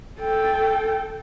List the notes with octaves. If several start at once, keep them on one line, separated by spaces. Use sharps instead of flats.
A4 G5